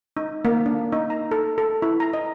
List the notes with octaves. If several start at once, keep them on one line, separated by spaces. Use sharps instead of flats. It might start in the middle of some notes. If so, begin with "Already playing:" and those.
D#4
A#3
D4
D#4
A#5
A4
A4
E4
A#5
D#5